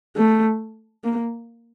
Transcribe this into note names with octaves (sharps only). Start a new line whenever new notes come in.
A3
A#3